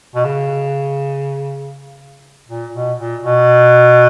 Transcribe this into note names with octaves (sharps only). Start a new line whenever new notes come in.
B2
C#3
A#2
B2
A#2
B2